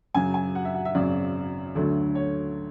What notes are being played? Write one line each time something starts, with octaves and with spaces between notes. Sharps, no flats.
F#2 C#3 F#3 G#5
G#5
F#5
E5
F#5
E5
G#1 F#2 C#3 F#3 D5
D2 D3 F#3 A3
C#5